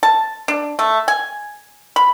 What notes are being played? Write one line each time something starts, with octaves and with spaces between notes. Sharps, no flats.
A5
D4
A3
G#5
B5